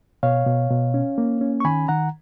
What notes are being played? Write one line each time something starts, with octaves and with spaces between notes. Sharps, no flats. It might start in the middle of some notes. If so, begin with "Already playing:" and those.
B2 C#5 F5
B2
B2
C#4
A#3
C#4
C#6
D#3 G#5 B5
D#3 F#5 A#5